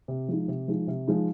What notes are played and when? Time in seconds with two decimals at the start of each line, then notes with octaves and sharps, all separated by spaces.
0.08 C3
0.29 F3 G#3 D#4
0.48 C3
0.68 F3 G#3 D#4
0.88 C3
1.08 F3 G#3 D#4